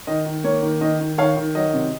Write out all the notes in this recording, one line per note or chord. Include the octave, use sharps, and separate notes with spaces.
D#3 D#5
D#3
A#3 C#5
D#3
D#3 D#5
D#3
D#3 C#5 F5
D#3
F#3 D#5
C3